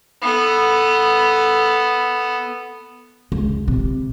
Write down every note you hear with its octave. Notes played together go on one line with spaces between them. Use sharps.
B3 A4
C#2
C3